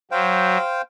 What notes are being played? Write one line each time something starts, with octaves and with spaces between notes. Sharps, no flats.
F#3 C5 F5 G5